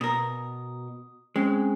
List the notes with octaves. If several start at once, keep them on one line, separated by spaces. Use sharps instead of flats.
B2 A#4 D#6
G#3 C4 C#4